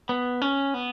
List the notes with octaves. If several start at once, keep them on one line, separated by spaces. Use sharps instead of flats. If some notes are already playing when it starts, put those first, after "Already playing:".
B3
C#4
B3